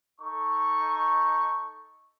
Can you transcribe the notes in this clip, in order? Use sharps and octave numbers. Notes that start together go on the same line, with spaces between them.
D#4 A4 C#6